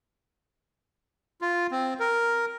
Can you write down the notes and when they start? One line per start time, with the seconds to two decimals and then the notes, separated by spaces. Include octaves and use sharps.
1.41 F4
1.71 C4
2.00 A#4